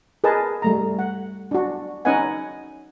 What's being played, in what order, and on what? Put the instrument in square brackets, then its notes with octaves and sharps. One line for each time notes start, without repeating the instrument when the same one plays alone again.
[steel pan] G#4 A#4 B4 D#5 A5
G3 A3 A#5
F#5
D4 F#4
C#4 D#4 B4 D#5 F#5 G#5